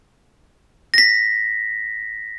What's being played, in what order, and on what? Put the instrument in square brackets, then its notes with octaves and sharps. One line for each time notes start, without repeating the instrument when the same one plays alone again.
[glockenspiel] A#6 B6